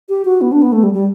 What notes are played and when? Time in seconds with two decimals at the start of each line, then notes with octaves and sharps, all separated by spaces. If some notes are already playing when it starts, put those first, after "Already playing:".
0.09 G4
0.25 F#4
0.41 B3
0.52 D4
0.62 B3
0.72 A3
0.83 G3
0.94 G3